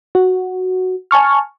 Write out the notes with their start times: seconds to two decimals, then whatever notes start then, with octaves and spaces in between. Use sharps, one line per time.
0.15 F#4
1.11 G#5 A5 C#6 F6